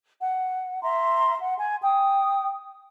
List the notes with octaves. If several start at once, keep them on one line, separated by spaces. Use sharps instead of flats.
F#5
E5 A#5 C6
F#5
G#5
G5 D#6